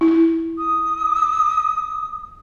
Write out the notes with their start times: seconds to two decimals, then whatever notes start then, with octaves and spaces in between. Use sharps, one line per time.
0.01 E4
0.57 D#6